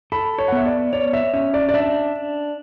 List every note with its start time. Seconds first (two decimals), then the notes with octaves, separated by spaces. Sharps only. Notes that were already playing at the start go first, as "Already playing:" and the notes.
0.12 A4 B5
0.38 C#5
0.48 F#5
0.52 B3 E5
0.66 D5
0.93 C#5 D5
1.13 E5
1.34 C#4 E5
1.54 D5
1.69 D5
1.74 D4 E5